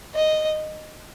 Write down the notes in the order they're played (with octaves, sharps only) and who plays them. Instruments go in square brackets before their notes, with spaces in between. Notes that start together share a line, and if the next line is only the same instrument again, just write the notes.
[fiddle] D#5